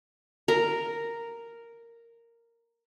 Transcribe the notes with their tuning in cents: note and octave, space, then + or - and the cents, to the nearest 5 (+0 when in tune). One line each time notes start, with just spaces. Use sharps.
A#4 -5